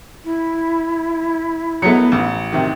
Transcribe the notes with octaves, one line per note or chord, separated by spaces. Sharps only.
E4
F#3 G#3 A3 B3 C#7
A1
C3 D#3